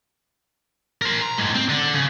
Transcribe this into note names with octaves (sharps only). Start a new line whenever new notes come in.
A#4 C5
A#5
A2 G#3
C4
D3
C#3